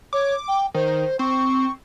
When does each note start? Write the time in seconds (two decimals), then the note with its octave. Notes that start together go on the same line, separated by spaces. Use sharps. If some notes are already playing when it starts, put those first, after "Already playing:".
0.13 C#5 D6
0.48 G5
0.74 D#3 C5
1.19 C4 C#6